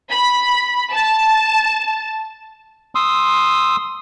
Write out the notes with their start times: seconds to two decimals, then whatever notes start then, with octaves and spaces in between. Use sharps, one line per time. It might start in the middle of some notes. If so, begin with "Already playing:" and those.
0.10 B5
0.92 A5
2.95 C6 D#6 E6